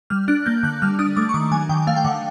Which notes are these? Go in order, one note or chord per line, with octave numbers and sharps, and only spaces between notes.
G3 F6
D4 F#6
A#3 G6
D3 F#6
G3 F6
D4 D#6
A3 D6
C#6
D#3 D6
F#3 G#5
D#3 G5
A3 F5
G5
D3 F#5